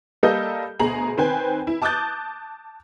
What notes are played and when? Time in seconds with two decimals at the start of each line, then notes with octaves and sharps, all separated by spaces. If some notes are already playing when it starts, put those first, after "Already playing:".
0.23 G3 A#3 A4 D#5 G6
0.79 D2 B2 G#4 A#5 F#7
1.17 D#3 C4 B4 C5 G5 G#5
1.67 E4
1.82 A5 D6 D#6 F#6 G6 A6